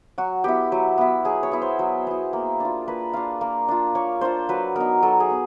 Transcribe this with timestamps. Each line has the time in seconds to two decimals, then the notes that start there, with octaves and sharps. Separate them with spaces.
0.18 F#3 F#4
0.44 B3 E4 G4
0.72 F#3
0.98 B3 E4
1.25 F#3 G#4
1.43 C#5
1.52 B3 E4
1.62 C5
1.79 F#3
2.07 B3 E4
2.33 A#3
2.60 D4 F4
2.88 A#3 B4
3.13 D4 F4 F5
3.41 A#3
3.69 D4 F4
3.95 A#3 C#5
4.21 D4 F4 C5
4.49 F#3 B4
4.76 B3 D#4 A#4
5.03 F#3 A4
5.20 G#4
5.30 B3